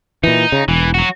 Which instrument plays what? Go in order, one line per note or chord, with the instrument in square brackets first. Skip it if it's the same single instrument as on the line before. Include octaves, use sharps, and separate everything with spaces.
[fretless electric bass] A#2 E3 [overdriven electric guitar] D#4
[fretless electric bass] C#3
[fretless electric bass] E1 [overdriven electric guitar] E3
[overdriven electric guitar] F#3 F#4